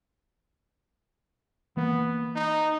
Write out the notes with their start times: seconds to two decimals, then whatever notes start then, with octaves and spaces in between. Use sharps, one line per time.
1.77 E3 A#3 B3
2.35 D#4